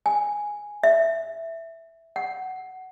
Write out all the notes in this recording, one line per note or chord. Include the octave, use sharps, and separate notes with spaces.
G#5
E5
F#5